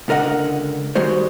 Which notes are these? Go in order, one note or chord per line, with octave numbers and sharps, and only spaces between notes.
C#2 D3 A#4 D#5 F#5
D#3 G3 G#3 F#4 C5